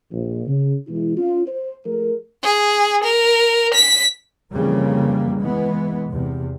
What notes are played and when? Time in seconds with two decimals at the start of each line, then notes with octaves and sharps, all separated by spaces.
0.11 A#1
0.46 C#3
0.88 B2 E3 G#3 E4
1.18 C#4 F4
1.46 C5
1.85 F3 A3 G#4 A#4
2.44 G#4
3.04 A#4
3.74 B6
4.53 F2 C#3 E3 F3 G3 A#3
5.40 E3 G#3 B3
6.10 E2 C3